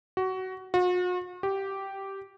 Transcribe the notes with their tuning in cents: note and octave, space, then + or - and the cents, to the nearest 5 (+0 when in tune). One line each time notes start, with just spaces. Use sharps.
F#4 +20
F#4 -45
G4 -10